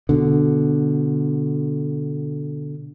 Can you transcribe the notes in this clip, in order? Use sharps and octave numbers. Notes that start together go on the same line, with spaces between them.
B2 D3